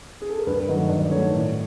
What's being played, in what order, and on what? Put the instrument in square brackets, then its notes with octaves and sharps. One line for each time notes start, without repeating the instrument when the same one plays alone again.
[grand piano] G#4
A4
A#4
G2 B4
D#3 F#3 A3 D#5
G2 D5
D#3 F#3 A3 C#5
A2